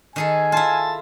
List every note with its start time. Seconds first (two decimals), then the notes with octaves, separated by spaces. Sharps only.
0.16 D#3 G#4 A4 G#5
0.52 E4 F4 A5